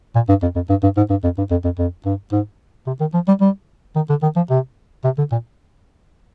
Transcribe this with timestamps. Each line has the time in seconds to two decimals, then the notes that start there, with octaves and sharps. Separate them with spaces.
0.15 A#2
0.29 G2
0.43 F2
0.55 F2
0.70 G2
0.83 G2
0.97 G#2
1.10 G2
1.24 F2
1.38 G2
1.51 F2
1.64 F2
1.78 F2
2.06 G2
2.32 G#2
2.87 C3
3.00 D#3
3.14 F3
3.28 G3
3.41 G3
3.96 D#3
4.09 D3
4.22 D#3
4.36 F3
4.50 C3
5.04 C3
5.18 D3
5.32 A#2